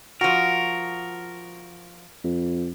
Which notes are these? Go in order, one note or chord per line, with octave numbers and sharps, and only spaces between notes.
F3 F#4 A#4
F2